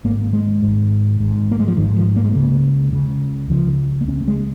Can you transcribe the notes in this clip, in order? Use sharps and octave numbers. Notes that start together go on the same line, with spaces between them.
G#1 G#2 A#3
G#3
G#1 G#2
G#1 G#2
A#3
G#3
F3
G#1 G#2 D#3
F3
A#3
G#3
C#2 C#3 A#3
C#2 C#3
C#2 C#3 F3
A#3
C#2 C#3 C#4
A#3
G#3